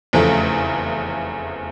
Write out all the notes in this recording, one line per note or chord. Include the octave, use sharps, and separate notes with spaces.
F1 E2 C#3 F3 A3